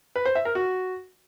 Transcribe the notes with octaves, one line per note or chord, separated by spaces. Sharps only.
B4
C5
E5
A#4
F#4